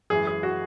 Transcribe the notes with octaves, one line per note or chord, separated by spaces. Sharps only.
F#2 E3 G#3 G#4
G#4
F#4